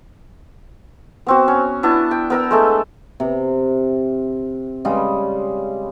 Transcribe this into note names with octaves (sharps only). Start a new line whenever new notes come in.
B3 C4 F#4
C#4
B3 D4 E4
G5
B3 A#4 E6
G#3 A3 A4
C3
C#3 G3 G#3